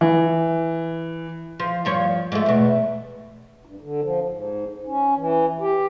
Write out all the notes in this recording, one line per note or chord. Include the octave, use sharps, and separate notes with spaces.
E3
F3
G2 F3 C#5
G#2 F3 A3
E2 B2
G2
D3
F3
G#2
C#4
E3
G4